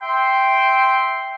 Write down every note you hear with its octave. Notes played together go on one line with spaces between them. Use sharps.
E5 G5 C6